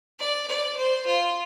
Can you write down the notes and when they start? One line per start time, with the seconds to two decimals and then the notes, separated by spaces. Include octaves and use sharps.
0.19 D5
0.47 D5
0.76 C5
1.06 F4